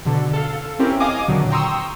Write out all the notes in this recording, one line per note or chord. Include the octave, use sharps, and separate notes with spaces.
B2 D3 A4
A4 F5
C4 C#4 E4 G4 A#4
D#5 F5 G#5 D6 D#6
E2 A#2 D3 D#3 F#3
G5 A#5 C6 C#6 D#6 E6